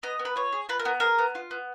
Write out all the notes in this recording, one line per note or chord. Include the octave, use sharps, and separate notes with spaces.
B3 D#5
B3
B4
F4 C#5
G#4
F4 B4
A#4
B3
G#4 A#4
B3
F4
B3